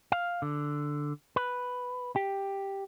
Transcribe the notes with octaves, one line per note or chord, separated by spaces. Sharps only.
F5
D3
B4
G4